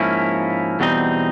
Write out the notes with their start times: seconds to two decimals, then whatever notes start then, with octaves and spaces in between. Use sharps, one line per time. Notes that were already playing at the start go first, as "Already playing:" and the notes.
Already playing: G#2 F3 A#3 C#4 E4
0.80 E2 B2 G3 C4 D#4